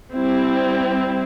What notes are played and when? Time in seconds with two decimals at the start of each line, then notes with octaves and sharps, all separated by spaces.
0.14 G3 C4 E4